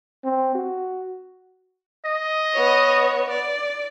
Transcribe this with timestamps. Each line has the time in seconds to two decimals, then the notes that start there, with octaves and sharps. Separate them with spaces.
0.24 C4
0.55 F#4
2.06 D#5
2.53 B3 C#5
3.30 D5